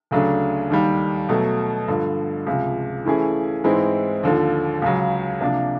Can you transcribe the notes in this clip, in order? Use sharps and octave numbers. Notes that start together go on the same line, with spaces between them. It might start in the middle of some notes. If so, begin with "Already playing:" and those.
D2 C#3 F#3 A3 D4
D#2 D#3 G3
B2 F#3 A3
G2 D3 F3
C#2 C3 F3
E3 A3 C#4 E4 G#4
G#2 E3 G#3 C4 E4
D#2 D3 F3
C#2 C#3 F#3
C3 F3 A#3 D4